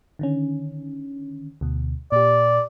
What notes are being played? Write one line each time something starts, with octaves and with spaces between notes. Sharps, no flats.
D3 D#3 C#4
D2 B2
A#2 G4 D5